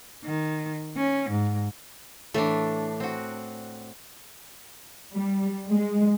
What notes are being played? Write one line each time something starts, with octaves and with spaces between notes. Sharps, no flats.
D#3
C#4
G#2
A2 E3 A3 D4
C4 F#4
G3
G#3